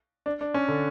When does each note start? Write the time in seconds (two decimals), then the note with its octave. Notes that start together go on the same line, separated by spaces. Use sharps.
0.26 D4
0.41 D4
0.54 C#4
0.68 D3